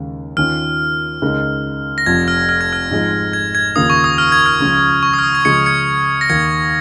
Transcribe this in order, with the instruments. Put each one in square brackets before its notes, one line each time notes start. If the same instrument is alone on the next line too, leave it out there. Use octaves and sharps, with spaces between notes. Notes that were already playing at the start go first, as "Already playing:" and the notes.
Already playing: [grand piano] D#2 C#3 G#3
[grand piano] D#2 D#3 C#4 F4 [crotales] F6
[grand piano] C#2 C#3 G#3 D#4 A#4
[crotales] A#6
[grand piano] F1 F2 F3 [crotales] G#6
[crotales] F6
F6
G#6
F6
[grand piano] G#2 F3 G#3 D#4
[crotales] G#6
G#6
[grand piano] D#2 C#3 A#3 F4 [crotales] D#6
[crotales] C#6
D#6
F6
G#6
F6
[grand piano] C#2 C#3 F3
[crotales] C#6
D#6
F6
D#6
G#6
[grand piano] C#2 C#3 F3 G#3 [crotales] G#6 C#7
[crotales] G#6 C#7
A#6
[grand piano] D#2 D#3 A#3 [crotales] G#6 C#7